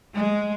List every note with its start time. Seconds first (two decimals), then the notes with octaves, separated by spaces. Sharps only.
0.16 G#3